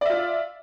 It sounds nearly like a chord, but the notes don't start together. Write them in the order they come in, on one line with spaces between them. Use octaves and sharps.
D5 E5 F4